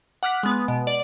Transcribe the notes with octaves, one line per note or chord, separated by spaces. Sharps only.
F#5 D6 F6 F#6 B6
G#3 B3
B2
D5